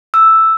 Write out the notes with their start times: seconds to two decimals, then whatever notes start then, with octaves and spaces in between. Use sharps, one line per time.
0.14 E6